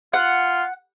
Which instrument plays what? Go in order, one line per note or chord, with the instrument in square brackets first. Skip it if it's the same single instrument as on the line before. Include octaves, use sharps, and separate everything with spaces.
[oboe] F4 [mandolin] F#5